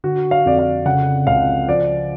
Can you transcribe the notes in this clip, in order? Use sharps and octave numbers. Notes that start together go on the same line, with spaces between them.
D3 F#4
F5
F2 D5
F5
C#3 F#5
C#2 F5
F3 D5